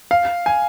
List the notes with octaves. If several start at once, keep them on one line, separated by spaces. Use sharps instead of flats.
F5
G#5